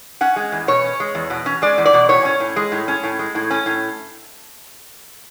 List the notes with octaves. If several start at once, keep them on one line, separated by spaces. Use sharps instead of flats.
C#4 F#5
G#3
E2
B2 C#5
C#4
G#3
E2
B2
C#4
G#3 D5
E2
D5
B2
A2 C#5
C#4
A2
G#3
A2
C#4
A2
G#3
A2
C#4
A2